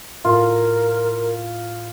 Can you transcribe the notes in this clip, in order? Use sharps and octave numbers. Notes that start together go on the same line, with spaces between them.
A2 F4 A#4